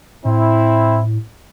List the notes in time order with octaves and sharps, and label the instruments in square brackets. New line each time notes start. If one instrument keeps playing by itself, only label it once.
[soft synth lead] A2 [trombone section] C4 E4